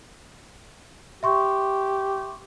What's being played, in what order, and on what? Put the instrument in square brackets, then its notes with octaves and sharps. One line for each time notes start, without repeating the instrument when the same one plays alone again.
[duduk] G4 [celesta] E5 C6 C#6